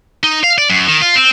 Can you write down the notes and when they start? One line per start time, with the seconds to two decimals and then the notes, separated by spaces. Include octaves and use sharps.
0.23 D#4
0.44 F5
0.58 D5
0.70 F#2
0.87 D#3
1.01 F4
1.16 C4